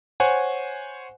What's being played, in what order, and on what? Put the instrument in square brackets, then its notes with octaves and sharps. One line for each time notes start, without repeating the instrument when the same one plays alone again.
[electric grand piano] C5 C#5 F#5 G#5